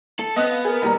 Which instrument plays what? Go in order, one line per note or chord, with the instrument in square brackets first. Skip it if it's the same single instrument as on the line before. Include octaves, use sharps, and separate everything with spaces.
[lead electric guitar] A4
[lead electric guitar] B3 [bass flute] C4 [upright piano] D#5 D#6 F#6
[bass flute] F5
[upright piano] G#4 [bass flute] A#4
[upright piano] E1 G3 A#5